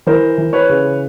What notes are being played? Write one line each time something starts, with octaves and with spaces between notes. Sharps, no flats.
E3 A#4 C5
E3
B4 C#5
C#3